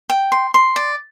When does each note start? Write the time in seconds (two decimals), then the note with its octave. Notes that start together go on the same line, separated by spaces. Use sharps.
0.10 G5
0.32 C6
0.54 C6
0.76 D5